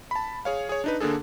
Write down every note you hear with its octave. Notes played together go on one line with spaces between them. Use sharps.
A5 B5
G#4 C#5 F5
G#4 C#5
D4 D#4 B4
D3 A#3 D4 G#4 A4